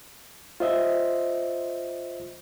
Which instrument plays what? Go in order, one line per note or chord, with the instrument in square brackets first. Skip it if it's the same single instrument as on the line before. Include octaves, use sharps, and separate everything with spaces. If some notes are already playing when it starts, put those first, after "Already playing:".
[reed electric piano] F4 C5 D#5 E5